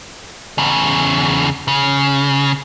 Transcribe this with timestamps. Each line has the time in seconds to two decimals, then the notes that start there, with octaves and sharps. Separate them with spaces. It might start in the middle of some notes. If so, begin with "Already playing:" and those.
0.58 E2 C#3
1.68 C#3